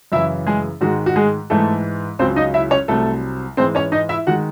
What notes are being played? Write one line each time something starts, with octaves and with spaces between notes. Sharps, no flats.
F#2 C#3 E3 E4 E5
G#3 G#4
G#2 D#3 G#3 F#4
F#4
G#3 G#4
G#2 E3 G#3 A3 A4
C#2 C#3 F#3 C4 C5
D#4 D#5
E4 E5
C#4 C#5
C2 C3 F#3 A3 A4
G#2 E3 G#3 C4 C5
C#4 C#5
D#4 D#5
E4 E5
D#3 G#3 F#4 F#5